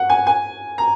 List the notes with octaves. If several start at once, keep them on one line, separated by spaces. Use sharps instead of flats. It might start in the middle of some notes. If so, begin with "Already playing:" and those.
Already playing: F#5
G#5
G#5
A#5